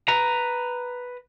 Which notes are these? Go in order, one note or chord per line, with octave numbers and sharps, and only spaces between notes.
B4 A#5